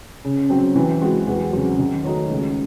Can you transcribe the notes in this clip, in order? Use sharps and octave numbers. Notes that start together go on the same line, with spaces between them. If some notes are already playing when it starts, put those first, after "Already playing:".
C#3
F#3 C4
E3
G#3 C4 F#4
E2
C#3 F#3 C4 F#4
D#3
A3 D#4 F#4 C#5
C#2